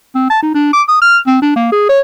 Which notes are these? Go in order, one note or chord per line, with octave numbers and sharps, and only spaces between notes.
C4
A5
D#4
D4
D6
D#6
F6
C4
D4
A#3
G#4
C#5